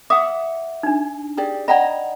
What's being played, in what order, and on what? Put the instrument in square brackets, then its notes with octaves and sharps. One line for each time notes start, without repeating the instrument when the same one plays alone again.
[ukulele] E5 F#5 [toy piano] D6 D#6
[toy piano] D4 D#4
[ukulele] G4 G#4 D5
[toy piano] D5 F#5 B5 [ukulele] D#5 G5 A#5